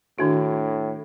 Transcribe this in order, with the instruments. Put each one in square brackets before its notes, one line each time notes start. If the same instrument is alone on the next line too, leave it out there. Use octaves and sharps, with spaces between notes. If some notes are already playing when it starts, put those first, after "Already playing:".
[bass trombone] A2 [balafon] D#3 D4 F#4